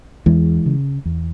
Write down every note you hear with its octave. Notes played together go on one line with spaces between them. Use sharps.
E2 E3 G#3
C#3
E2